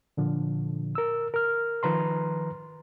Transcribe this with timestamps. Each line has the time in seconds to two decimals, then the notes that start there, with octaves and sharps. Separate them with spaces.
0.17 A#2 D3 F3
0.95 A#4 E6
1.34 A#4 F6
1.83 D#3 F3 B4 A#5 C6